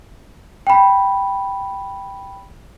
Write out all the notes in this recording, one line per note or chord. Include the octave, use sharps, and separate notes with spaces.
G5 B5